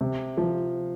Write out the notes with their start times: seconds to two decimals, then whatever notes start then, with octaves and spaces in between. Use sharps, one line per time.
0.01 C3
0.37 F3